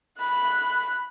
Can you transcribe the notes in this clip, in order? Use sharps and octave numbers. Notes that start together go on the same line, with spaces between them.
B5 F#6